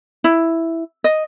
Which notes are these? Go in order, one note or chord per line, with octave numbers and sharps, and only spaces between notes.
E4
D#5